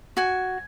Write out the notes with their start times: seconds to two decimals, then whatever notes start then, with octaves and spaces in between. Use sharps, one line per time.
0.17 F#4 G#5